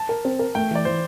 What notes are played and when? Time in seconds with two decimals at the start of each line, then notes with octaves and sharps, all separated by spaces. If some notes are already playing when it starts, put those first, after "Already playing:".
Already playing: A5
0.09 A#4
0.25 C4
0.39 A#4
0.55 A3 G5
0.71 E3 D5
0.85 E3 C5